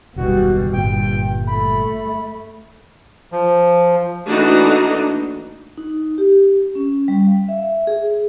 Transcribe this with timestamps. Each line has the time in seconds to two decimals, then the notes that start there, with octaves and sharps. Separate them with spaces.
0.16 F#1 D#2 B2 G3 F#4
0.72 G1 G2 A#2 G5
1.47 A3 B5
3.32 F3
4.26 E3 A3 A#3 D4 D#4 F#4
5.78 D#4
6.18 G4
6.75 C#4
7.08 G3
7.27 F5
7.48 E5
7.87 G#4